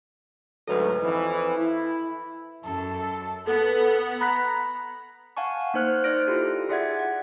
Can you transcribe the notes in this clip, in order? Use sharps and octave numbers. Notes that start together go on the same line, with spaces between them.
D2 G#2 F#3 A4 B4
F2 E3
E4
F#2 A4
B3 A4 F#5
A#5 B5 F#6 B6
F5 F#5 G#5 A5 C#6
A#3 D#4 C5 F6 F#6
D#4 C5 D5 F6 A#6 D7
E4 F4 G4 A4
F4 G#4 D5 E5 F#5 G#6
F#5